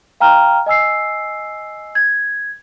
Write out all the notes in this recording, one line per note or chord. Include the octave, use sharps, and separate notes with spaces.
F5 G5 A#5 F6
D#5 G#5 E6 C7
G#6